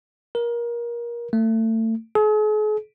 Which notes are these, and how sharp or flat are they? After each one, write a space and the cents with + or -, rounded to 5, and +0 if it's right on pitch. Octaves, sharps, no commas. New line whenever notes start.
A#4 +25
A3 +30
G#4 +45